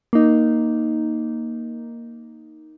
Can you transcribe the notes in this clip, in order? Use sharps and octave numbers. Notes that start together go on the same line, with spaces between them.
A#3 D#4